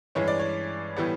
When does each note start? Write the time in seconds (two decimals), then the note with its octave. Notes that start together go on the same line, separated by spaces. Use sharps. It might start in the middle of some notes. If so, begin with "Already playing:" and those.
0.15 G2 E3 G#3 C#4 C#5
0.28 D5
0.39 C#5
0.96 A2 E3 G3 B3